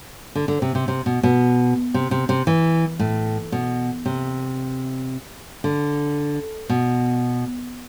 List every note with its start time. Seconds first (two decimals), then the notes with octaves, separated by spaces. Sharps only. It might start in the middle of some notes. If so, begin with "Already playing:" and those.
0.35 D3
0.48 D3
0.62 C3
0.75 C3
0.88 C3
1.06 B2
1.23 B2
1.94 C3
2.11 C3
2.29 C3
2.47 E3
2.99 A2
3.52 B2
4.06 C3
5.64 D3
6.69 B2